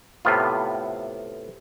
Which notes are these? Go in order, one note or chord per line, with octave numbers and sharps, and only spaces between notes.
A2 C3 B3 F4